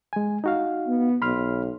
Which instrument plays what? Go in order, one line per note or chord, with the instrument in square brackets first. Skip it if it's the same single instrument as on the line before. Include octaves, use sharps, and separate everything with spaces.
[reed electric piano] G#3 G#5
D#4 F#4 F5
[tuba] B3
[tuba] B1 [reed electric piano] B5 C6 F6